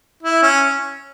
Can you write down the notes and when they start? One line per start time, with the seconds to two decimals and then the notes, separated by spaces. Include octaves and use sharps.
0.23 E4
0.43 C#4